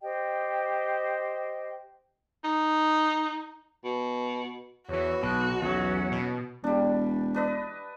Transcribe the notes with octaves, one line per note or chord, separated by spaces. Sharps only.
G4 C5 D#5 G5
D#4
B2
E2 E3 F#4 C#5
B1 B2 F#6
E2 F#3 C#4 F#5
B2
E1 G3 D4
D4 B4 D#5